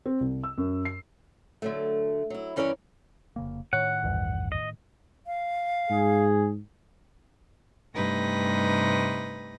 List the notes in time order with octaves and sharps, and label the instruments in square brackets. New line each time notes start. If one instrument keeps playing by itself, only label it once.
[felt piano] C4
C2
E6
F#2
C7
[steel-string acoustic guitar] D3 F#3 A3
F#3 E4
G2 E3 C#4 A#4 C#5 D5
[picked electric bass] F1 C#3 A#3
[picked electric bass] A2 D#3 [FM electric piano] C#5 [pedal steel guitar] F#5
[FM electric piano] A#1 E2 G2
[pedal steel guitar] D#5
[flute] F5
[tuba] G#2 [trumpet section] G#4
[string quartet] G2 C3 A3 D#4 B4 A#6